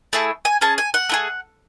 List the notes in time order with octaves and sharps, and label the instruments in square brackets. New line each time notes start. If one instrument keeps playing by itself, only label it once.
[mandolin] A3 E4 G#4 A5
G#5
C#4 G#4 A5
G#5
F#5
A3 E4 G#4